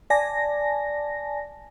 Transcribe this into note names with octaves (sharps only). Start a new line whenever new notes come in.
D5 G#5 A5 A#6